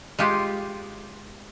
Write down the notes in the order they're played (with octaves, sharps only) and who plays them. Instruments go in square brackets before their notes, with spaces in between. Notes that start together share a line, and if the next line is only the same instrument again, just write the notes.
[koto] G#3 F4 G4